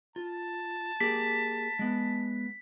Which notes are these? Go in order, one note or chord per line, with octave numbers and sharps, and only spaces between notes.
F4 A5
A#3 G4 G#4 B6
G#3 B3